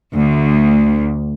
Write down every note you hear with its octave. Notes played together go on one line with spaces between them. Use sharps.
D2